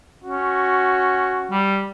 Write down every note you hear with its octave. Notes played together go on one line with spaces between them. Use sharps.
C#4 F#4
G3